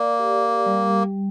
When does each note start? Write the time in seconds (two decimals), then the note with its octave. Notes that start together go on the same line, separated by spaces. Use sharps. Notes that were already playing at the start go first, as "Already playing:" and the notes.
Already playing: A#3 D5
0.19 G4
0.66 G3